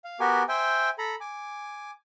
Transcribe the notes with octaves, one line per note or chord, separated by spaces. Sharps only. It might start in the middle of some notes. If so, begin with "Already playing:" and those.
F5
B3 F#4 G4 A#4 G#5
C5 E5 G5 G#5
A4 A#5 B5
G#5 D6